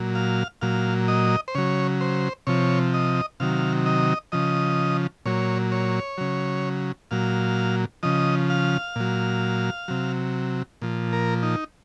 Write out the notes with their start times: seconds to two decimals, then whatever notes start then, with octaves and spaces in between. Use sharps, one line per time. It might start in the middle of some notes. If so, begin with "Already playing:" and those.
Already playing: A#2 F#3
0.15 F5
0.61 A#2 F#3 F5
1.08 D#5
1.48 C5
1.55 C#3 F#3 C#5
2.01 C5
2.47 C3 F3 C#5
2.94 D#5
3.40 C3 D#3 F#3 F5
3.86 D#5
4.32 C#3 F3 D#5
5.26 A#2 F#3 C#5
5.72 C#5
6.18 C#3 F#3
7.11 A#2 F#3 F5
8.03 C#3 F3 D#5
8.50 F5
8.96 A#2 F#3
9.88 C3 F#3
10.82 A#2 F3
11.13 A#4
11.43 D#4